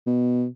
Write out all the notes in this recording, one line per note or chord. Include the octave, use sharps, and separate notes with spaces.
B2